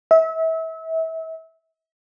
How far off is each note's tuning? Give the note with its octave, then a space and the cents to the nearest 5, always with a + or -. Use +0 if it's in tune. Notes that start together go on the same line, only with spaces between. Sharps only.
E5 -30